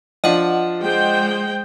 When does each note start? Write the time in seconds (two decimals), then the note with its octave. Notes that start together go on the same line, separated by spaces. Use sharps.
0.24 F3 D4 D#5 F#5
0.82 G#3 C5 G5